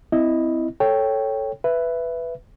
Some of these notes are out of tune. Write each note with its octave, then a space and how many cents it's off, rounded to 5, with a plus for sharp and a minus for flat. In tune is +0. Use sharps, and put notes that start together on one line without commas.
C4 -30 E4 -5 D#5 +0
A4 +0 C#5 +0 G5 +0
B4 +5 E5 +15